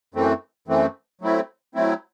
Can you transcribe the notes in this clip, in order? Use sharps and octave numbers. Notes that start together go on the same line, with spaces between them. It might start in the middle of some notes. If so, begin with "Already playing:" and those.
F#2 E3 A3 C4
F#2 E3 A3 C4
F#3 A3 C4 E4
F#3 A3 C4 E4